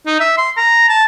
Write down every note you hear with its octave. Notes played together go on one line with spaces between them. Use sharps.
D#4
E5
C6
A#5
A5